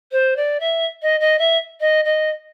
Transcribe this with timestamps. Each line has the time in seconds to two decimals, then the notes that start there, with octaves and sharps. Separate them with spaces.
0.12 C5
0.36 D5
0.60 E5
1.02 D#5
1.20 D#5
1.39 E5
1.80 D#5
2.05 D#5